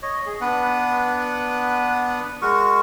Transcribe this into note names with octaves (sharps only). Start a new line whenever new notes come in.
C#5 D#5
G#4
B3 D4 B4 F#5
G#3 F#4 A#4 C#6